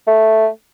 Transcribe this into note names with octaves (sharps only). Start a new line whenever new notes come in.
A3